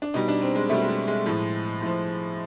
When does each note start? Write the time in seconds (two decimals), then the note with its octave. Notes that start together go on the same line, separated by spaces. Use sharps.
0.02 D4
0.14 B2 G3 D#4
0.28 D4
0.42 C4
0.55 G#3
0.69 B2 G3 A3
0.82 G#3
0.89 G3
1.08 G#3
1.26 A2 F3
1.82 A2 F3